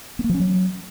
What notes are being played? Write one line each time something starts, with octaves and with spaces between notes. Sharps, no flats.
B3
A#3
F3
C#4
F#3